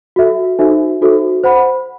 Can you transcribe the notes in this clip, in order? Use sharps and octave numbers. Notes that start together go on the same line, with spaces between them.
F#4 A4 E5
D#4 F#4 A4 C5 E5
D#4 F#4 A4 C5 E5
C5 F#5 B5